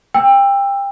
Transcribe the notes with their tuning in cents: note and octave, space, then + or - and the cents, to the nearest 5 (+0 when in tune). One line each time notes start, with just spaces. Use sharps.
G5 +25 E6 +10